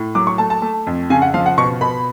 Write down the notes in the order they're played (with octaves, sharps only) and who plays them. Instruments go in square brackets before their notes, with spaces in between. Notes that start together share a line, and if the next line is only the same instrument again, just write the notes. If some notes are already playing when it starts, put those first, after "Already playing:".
Already playing: [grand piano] A2
F#3 D6
C#6
A3 A5
A5
A3
F2
C#3 G#5
F#5
F3 F5
F#5
B2 C#6
B2 B5